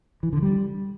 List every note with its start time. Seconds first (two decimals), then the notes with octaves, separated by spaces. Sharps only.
0.23 E3
0.33 D3
0.42 G3